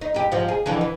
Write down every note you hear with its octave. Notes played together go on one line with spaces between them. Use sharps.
D#4
G2 G4
G#2 F3 G3
G#4
F2 D3 E3
E3